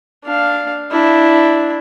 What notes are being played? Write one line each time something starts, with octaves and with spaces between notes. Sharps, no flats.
D4 F5
D4 E4